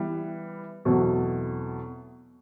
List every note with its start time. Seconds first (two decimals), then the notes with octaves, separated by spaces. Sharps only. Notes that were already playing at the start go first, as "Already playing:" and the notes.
Already playing: E3 G3 B3
0.85 E2 B2 F#3 A3 C4